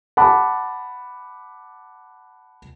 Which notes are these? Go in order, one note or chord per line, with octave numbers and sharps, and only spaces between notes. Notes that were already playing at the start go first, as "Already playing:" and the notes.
F#5 A5 B5 D6